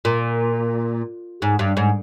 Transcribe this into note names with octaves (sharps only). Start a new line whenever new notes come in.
A#2
G#2
G2
G#2